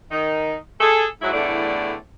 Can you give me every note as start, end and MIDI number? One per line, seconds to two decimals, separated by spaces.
0.11 0.55 51
0.11 0.55 63
0.81 1.06 68
0.81 1.06 69
1.22 1.32 44
1.22 1.32 54
1.22 1.32 64
1.33 1.94 40
1.33 1.94 45
1.33 1.94 50
1.33 1.94 57
1.33 1.94 64
1.33 1.94 74